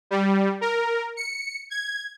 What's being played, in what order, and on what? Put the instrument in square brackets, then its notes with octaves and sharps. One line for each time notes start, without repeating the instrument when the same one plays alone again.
[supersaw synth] G3
A#4
C#7
G#6